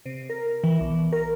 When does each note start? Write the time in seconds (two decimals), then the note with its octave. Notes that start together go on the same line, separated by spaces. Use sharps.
0.06 C3
0.30 A#4
0.64 E3
0.81 B1
1.12 A#4